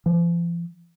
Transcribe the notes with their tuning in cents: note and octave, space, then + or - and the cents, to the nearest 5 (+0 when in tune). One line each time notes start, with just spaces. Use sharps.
F3 -40